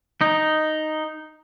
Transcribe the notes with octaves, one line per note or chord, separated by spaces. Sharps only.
D#4